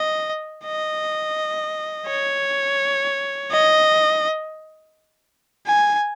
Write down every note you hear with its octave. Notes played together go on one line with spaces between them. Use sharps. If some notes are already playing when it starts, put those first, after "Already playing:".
Already playing: D#5
D#5
C#5
D#5
G#5